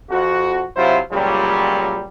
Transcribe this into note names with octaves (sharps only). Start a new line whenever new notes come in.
F2 F#4
C3 F#3 E4 F4 C5
C#2 A#2 F#3 G3